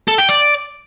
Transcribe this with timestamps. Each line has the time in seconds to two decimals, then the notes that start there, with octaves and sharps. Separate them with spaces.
0.08 A4
0.18 G5
0.29 D5